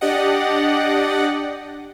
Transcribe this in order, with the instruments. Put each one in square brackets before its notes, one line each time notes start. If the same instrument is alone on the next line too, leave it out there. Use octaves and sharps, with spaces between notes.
[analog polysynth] D4 G4 D5 D#5 F#5